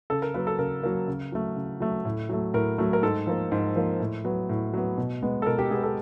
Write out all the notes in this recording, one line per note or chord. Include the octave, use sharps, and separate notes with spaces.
C#3 A4
A#4
F#3 A#3 B4
A4
C#3 A#4
F#3 A#3
C#3
F#3 A3
C#3
F#3 A3
A2
F#3 A3
A2 A#4
F#3 A3
A#4
G#2 A4
F3 A#3
G#2
F3 A#3
A2
F#3 B3
A2
F#3 B3
B2
G#3 B3
A4
B2 A#4
G4
G#3 B3 G#4
A4